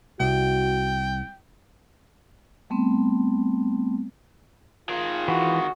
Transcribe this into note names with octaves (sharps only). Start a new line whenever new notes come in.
C2 F#4 G5
G3 A3 B3 C4
D#3 F4 G#4
E3 F#4